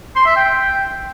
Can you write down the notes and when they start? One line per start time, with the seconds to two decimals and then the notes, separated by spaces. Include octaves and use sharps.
0.16 C6
0.26 E5
0.36 G5